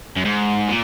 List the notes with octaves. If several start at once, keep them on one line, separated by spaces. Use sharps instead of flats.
F#2
G#2
A#2